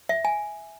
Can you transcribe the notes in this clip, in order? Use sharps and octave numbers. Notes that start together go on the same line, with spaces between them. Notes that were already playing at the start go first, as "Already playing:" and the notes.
E5
G#5